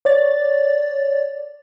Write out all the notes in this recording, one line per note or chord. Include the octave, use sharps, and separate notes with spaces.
C#5 D5 A6